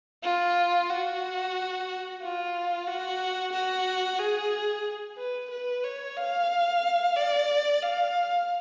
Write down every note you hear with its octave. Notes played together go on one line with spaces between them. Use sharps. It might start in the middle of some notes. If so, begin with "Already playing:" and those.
F4
F#4
F4
F#4
F#4
G#4
B4
B4
C#5
F5
D5
F5